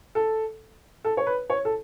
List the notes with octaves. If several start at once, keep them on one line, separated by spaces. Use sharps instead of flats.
A4
A4
C#5
B4
C#5
A4